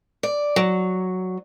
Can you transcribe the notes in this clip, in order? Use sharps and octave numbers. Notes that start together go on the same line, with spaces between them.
D5
F#3